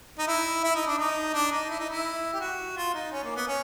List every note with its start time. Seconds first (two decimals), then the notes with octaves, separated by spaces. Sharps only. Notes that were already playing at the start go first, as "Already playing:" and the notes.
0.19 D#4
0.27 E4
0.63 E4
0.76 D#4
0.87 D4
0.98 D#4
1.34 D4
1.52 D#4
1.70 E4
1.79 D#4
1.90 E4
2.33 G4
2.40 F#4
2.77 F4
2.94 D#4
3.12 C#4
3.24 A#3
3.36 B3
3.47 C#4